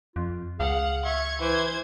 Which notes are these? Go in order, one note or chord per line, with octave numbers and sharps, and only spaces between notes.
F2 F4
C#2 G#4 F5 F#5
E5 C#6 G#6
E3 C5 E5 G#6